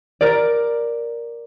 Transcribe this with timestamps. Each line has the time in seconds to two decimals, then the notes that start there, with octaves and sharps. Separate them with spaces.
0.21 A#4 D5